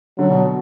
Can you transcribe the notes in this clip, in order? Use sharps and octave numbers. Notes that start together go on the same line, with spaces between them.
D3 F#3
B2